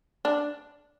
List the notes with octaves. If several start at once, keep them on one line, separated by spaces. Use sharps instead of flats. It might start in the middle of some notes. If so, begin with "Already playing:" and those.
D4